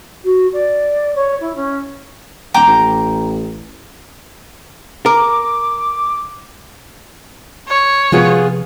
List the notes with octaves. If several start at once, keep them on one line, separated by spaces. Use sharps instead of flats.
F#4
D5
C#5
E4
C#4
D#1 G5 A#5 D6
A1
A#4 D6
C#5
C3 F3 B3 F4 G#4